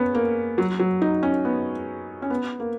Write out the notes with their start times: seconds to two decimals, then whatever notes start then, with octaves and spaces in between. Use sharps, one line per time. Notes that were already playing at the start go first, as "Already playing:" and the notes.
Already playing: B3 C#4
0.15 A#3
0.58 F#3
0.80 F#3
1.02 D#4
1.23 C#4
1.45 B3
2.22 C#4
2.30 B3
2.60 A#3